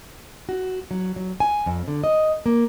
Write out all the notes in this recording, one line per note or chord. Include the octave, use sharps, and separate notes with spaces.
F#4
F#3
F#3
G#5
F2
D3
D#5
A#3